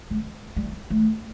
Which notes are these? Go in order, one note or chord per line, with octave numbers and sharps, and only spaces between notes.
G#3
G3
A3